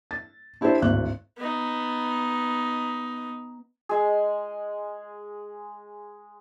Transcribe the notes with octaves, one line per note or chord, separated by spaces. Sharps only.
A6
D4 E4 G4 A4 C5 D5
G#1 D2 A2 F#6
B3 D#4
G#3 G#4